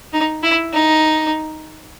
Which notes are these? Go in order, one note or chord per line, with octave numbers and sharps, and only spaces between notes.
D#4
E4
D#4